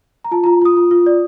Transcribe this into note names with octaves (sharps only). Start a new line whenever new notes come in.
A#5
F4 A5
F4 A#5
F4 D#6
F4
F4
D5